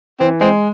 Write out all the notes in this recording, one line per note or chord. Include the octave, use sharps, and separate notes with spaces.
E3 C4
G#3 C4